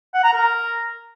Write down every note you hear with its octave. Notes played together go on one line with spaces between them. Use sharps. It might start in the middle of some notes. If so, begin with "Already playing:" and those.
F#5
A#5
A#4